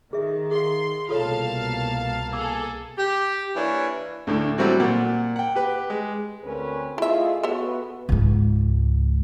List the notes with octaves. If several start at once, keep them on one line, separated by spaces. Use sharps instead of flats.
D#3 G#4 E5
G#4 F5 C6
C2 B2 A#3 F4 A4 C#5 F5 A5
G#4 A4 D6 E6
G4
E3 A#3 D4 A#4 C#5
D2 A2 D3
F#3 G3 A3 C4 E4 F#4
A#2 F#5
F#5 G5
G4 B4
G#3
D2 C4 C#4 A#4 B4
A3 E4 F4 G#4 D#5 E5
B3 F#4 A4 B4 C#5 E5
C#2 G#2